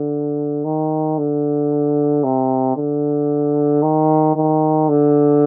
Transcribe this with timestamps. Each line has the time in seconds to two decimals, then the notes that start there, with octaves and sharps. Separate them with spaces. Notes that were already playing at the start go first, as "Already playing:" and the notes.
Already playing: D3
0.65 D#3
1.18 D3
2.24 C3
2.77 D3
3.83 D#3
4.36 D#3
4.89 D3